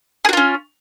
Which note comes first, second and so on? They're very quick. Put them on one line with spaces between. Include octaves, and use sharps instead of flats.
G#4 F#4 F4 C#4